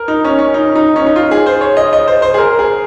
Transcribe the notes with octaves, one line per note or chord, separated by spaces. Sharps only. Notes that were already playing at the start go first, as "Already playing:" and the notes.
Already playing: A#4
D#4
C#4
C#4
D#4
D#4
C#4
D#4
F4
G#4
C5
C#5
D#5
D#5
C5
C5
G#4
A#4
G#4